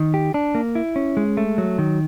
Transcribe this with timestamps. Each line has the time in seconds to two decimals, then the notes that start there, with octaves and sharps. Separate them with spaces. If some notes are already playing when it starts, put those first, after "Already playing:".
Already playing: D#3
0.14 G4
0.34 D4
0.55 A#3
0.75 E4
0.96 C#4
1.17 G#3
1.37 A3
1.58 F#3
1.78 D#3